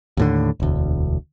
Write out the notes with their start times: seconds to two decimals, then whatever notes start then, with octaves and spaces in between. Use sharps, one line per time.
0.17 D#2 A2 D3
0.60 E1 D2